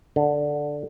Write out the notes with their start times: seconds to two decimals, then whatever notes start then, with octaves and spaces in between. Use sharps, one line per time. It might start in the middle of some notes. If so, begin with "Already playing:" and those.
0.16 D3